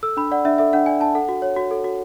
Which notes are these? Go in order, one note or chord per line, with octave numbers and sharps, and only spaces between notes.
A4 E6
D4 B5
D5 F#5
D4 E5
A4 E5
D4 F#5
D5 G#5
D4 A5
A4 F#5
F#4
C#5
F#4
A4
F#4